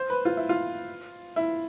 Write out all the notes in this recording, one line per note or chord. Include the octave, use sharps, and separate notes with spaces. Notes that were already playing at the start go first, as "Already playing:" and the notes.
Already playing: C5
B4
F4
E4
F4
E4